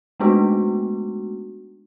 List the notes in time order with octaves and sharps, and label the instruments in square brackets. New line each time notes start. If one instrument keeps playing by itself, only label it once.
[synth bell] G#3 A3 B3 D4 D#4 F#4